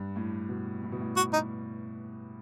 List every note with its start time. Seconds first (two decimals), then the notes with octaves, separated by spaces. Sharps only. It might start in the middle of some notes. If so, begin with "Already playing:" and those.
Already playing: G2
0.16 A2
0.49 B2
0.83 A2
0.92 B2
1.00 A2
1.17 F#4
1.33 D#4